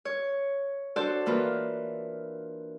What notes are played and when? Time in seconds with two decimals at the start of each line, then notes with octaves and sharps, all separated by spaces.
0.05 C#5
0.96 D4 F#4 A4 C5 D5
1.26 E3 A#3 F4 B4